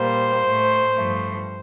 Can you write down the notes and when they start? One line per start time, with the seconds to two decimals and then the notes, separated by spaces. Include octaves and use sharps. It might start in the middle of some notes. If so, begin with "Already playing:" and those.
Already playing: A#2 G3 A#3 C5
0.43 A2
0.48 A3
0.94 G2 F3 A3